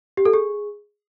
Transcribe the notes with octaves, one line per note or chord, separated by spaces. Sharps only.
G4
A4
G#4